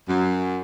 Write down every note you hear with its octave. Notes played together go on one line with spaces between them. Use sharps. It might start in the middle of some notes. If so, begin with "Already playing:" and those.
F#2